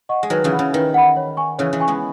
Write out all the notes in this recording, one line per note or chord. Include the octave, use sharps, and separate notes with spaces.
D#5 F#5 C#6
G#3
D#3 F#3 B4
C#3 E3
F#5 B5
C#3
D#3 B4
F#5 B5
C#5
G#5 C#6
C#3 E3 C#5
E3 G#3
G#5 C#6
G#3 B3